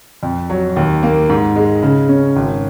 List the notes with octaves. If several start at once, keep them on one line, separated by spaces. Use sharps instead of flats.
F2
F#3
D#2
A#3
G#2
G#3
C#3
C#4
G#1